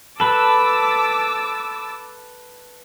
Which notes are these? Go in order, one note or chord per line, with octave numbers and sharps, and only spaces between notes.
A4 B4 A5 D6 E6